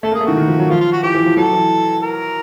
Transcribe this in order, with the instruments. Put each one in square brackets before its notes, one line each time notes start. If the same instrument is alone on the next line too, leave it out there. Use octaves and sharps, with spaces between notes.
[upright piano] A3 [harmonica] A4
[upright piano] A#3
[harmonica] G#4
[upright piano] A3
[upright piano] D#3 [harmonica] F#4
[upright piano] D#3
F3
F#3
[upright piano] F3 [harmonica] F4
[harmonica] F4
F#4
[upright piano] E3 [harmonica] G4
[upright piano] E3
F3
[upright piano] F#3 [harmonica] A4
[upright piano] E3
[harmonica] A#4